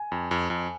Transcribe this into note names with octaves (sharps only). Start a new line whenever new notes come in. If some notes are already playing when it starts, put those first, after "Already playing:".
Already playing: G#5
F2
F2
F2